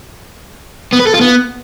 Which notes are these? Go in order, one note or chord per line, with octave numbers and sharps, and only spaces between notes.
B3
B4
A4
F4
B3